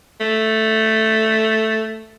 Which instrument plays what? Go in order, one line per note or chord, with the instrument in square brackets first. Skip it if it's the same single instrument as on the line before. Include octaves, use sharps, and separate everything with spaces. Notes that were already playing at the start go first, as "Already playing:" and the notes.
[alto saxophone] A3